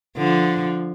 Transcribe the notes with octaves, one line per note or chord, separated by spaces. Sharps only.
D3 F3